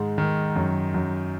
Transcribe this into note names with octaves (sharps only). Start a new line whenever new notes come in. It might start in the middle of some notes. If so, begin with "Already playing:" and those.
Already playing: G#2 D#3 G#3
D#3
F#2
F#2